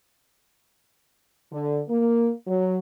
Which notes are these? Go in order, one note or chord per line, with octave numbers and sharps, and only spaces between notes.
D3
A#3
F#3